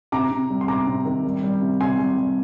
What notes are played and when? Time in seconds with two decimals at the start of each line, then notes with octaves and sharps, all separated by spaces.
0.12 C3 A#5 D6
0.31 C3
0.50 G3
0.61 C6
0.68 C3 A#5 D6
0.87 C3
1.05 D#3
1.25 G3
1.43 G3
1.62 C3
1.80 C3 G#5 C6
1.99 G3
2.17 G3